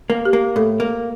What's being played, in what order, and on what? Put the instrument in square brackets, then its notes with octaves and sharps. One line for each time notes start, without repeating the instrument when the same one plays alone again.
[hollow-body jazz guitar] A#3
[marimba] G4
[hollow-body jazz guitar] A#3
[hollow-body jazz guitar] A2 [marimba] A4
[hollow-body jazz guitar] A#3